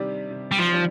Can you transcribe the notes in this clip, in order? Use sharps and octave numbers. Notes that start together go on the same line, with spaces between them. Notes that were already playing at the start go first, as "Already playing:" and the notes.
Already playing: C3 D#3 G3 D4 G4
C3
G3
F3
D#3 G3 D4 G4